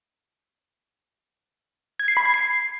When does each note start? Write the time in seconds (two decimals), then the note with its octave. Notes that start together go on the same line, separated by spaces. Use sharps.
2.00 G#6
2.08 C7
2.17 B5
2.25 G#6
2.34 C7